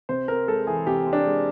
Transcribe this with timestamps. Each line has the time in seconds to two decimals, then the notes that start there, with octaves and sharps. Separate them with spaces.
0.09 C3 C5
0.28 C4 A#4
0.48 G#3 A4
0.67 E3 G#4
0.87 C3 G4
1.06 C4
1.13 D4
1.26 G#3